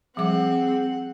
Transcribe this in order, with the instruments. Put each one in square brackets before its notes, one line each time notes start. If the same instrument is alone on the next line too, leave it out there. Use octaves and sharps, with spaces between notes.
[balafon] F3 G3 D6 [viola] C4 [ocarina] G#4 [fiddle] F#5